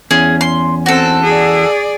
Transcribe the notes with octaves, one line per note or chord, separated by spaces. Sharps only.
E2 C#4 G#4
C6
C4 F#4 A4
G#4 D5